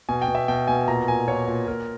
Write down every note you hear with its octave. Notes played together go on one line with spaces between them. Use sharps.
B2 G#5
G5
B2
E5
B2 G5
B2 G#5
A#2 A#5
A#2 G#5
A#2 C#5
A#2
A#2 A#4